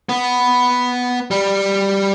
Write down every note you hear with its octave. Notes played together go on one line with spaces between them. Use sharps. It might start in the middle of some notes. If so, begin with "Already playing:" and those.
B3
G3